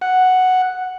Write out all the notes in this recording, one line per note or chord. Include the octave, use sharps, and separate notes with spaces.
F#5